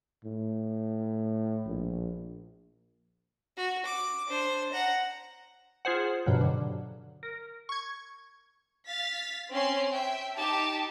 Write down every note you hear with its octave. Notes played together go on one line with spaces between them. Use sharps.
A2
A#1
F#4
D6
D4 C5
F#5 A#5
F4 G#4 C5 F#5
G2 B2 F3 F#3
D3
A#4
C#6 G#6
F5 A6 B6
C4 C#4 C#5 C6
E5 G5
D#4 G4 A5